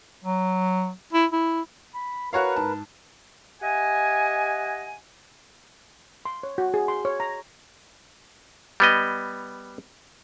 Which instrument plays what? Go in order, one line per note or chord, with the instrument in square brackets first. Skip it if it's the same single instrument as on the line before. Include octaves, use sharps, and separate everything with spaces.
[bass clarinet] F#3
E4
E4
[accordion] B5
[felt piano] F#4 C#5 F5 [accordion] A#4 B4
[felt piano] G#2 A5
[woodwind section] G4 D#5 E5 F#5 G#5
[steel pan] C6
C#5
F#4
G#4
C6
C#5
A#5
[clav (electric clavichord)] G3 B3 D#5